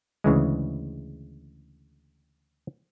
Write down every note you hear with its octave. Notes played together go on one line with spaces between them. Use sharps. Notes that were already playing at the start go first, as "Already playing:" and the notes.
D2 C#3 E3 G#3